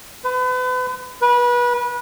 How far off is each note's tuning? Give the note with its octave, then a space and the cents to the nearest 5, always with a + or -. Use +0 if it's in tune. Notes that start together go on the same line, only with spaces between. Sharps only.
B4 +35
B4 -25